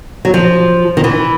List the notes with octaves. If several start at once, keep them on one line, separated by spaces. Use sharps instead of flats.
F#3
F3
D#3
E3